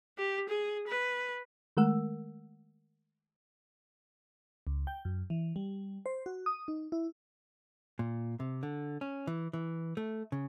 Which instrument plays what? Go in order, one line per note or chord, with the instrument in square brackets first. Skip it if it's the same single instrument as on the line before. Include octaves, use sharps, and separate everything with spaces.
[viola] G4
G#4
B4
[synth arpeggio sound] D#3 G#3 A3 A#4 F#5 E6
[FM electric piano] C#2
G5
F#2
E3
G3
C5
F#4
D#6
D#4
E4
[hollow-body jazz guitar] A#2
C3
D3
C#4
E3
E3
A3
C#3